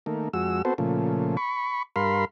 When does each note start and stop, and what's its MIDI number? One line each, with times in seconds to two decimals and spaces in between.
0.06 0.29 51
0.06 0.29 57
0.06 0.29 58
0.33 0.62 41
0.33 0.62 56
0.33 0.62 66
0.33 0.62 88
0.65 0.74 59
0.65 0.74 60
0.65 0.74 66
0.65 0.74 69
0.65 0.74 72
0.78 1.37 46
0.78 1.37 49
0.78 1.37 53
0.78 1.37 57
1.37 1.83 83
1.37 1.83 85
1.96 2.25 43
1.96 2.25 70
1.96 2.25 77
1.96 2.25 83
1.96 2.25 84